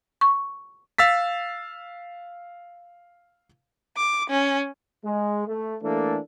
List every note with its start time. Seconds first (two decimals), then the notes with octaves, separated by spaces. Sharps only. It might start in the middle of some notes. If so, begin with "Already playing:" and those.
0.21 C#6
0.98 F5 E6 A6 B6
3.97 D6
4.30 C#4
5.04 G#3
5.47 A3
5.82 E3 A3 A#3 D4 A4